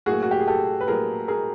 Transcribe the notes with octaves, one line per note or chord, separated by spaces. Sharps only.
A2 F#3 A#3 F#4 G#4
F#4
G4
G#4
G4 A4
B4
A2 F#3 A#3 G#4 A#4
G#4 A#4